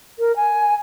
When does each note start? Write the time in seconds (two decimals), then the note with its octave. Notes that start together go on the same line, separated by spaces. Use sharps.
0.19 A#4
0.36 G#5